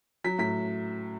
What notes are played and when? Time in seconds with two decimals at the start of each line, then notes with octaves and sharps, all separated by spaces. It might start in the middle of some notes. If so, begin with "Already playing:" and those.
0.24 F#3 B6
0.38 A2 B6